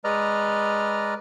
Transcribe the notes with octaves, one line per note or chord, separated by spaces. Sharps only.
G#3 B4 D5 D#5 A#5 F6